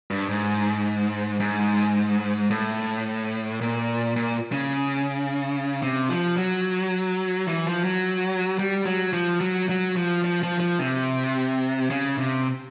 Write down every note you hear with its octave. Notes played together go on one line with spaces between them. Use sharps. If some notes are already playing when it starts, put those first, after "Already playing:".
G2
G#2
G#2
A2
A#2
A#2
C#3
C3
F3
F#3
E3
F3
F#3
G3
F#3
F3
F#3
F#3
F3
F3
F3
F3
C3
C#3
C3